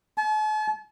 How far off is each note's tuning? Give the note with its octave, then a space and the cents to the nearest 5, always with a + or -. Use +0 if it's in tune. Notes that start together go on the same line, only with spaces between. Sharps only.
A5 -45